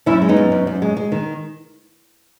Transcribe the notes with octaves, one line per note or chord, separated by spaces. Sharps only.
F#2 C#4 E4
G#3
B3 D#4
F#2
F#2
F#2
G#3
G#3
D#3